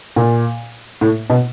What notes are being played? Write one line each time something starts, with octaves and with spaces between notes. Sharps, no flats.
A#2
A2
B2